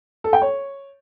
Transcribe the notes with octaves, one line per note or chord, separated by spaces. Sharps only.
A4
G5
C#5